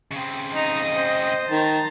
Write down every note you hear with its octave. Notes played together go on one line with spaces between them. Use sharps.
C#3 C4
D#4 D#5 D#6
C5
D#3 A5 A#5 C6